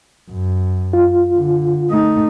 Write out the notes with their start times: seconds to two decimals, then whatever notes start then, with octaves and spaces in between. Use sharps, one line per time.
0.31 F#2
0.93 F4
1.34 D3
1.90 A3 D#4